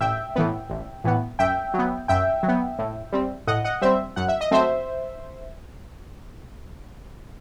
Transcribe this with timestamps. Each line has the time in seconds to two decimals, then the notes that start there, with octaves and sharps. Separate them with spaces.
0.01 A1 E5 G5
0.36 A2 E3 B3
0.70 A1
1.04 A2 E3 B3
1.39 F#2 E5 G5
1.74 F#3 B3
2.08 F#2 E5 G5
2.43 F#3
2.48 B3
2.79 A2
3.12 G3 C4
3.47 A2 D#5 F#5
3.64 D#5 F#5
3.81 G3 C4 C5 E5
4.16 F#2 F#5
4.28 E5
4.41 D#5
4.51 F#3 A3 C4 C5 E5